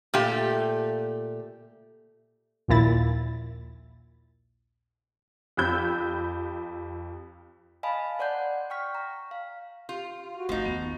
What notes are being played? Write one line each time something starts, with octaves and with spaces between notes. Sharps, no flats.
A#2 A3 G4
A#1 D#2 A#2 E4 A6
F2 G4 B5 E6 G6
D#5 F5 G#5 A5 B5
C5 D5 F#5 C6 G6
D5
G5 C#6 F6 B6
A#5
F5
F4 G4
F#4
G1 F3 A3 D#4
D#2 B3